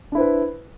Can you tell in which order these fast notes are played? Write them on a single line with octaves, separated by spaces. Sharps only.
D4 E4 C5 B4